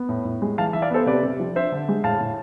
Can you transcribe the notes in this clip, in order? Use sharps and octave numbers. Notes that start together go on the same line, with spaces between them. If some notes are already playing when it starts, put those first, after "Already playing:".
Already playing: B3
A2
A2
G#3
E3 F5 A5
E3 E5
D5 F5
B3 A4 C5
C3 B4 D5
C3
F3
D4 C5 E5
D3
G#3
A2 F5 A5
A2